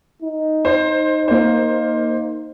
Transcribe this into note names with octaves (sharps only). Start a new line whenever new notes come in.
D#4
C5
A#3 C5